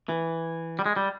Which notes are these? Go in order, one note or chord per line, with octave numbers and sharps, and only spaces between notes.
E3
G3
G#3
G3